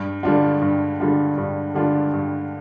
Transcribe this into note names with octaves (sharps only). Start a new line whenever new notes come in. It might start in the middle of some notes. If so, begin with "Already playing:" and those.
Already playing: G2
D3 G3 D4 F4
G2
D3 G3 D4 F4
G2
D3 G3 D4 F4
G2